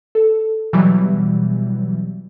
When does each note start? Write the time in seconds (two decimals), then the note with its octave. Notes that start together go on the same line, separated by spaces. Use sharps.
0.15 A4
0.73 B2 E3 F#3 G3